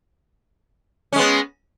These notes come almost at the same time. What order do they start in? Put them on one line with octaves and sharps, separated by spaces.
C#4 G#3 B3